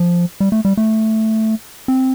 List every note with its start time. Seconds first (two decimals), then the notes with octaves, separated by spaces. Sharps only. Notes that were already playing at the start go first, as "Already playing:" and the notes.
Already playing: F3
0.40 G3
0.52 A3
0.65 G3
0.77 A3
1.88 C4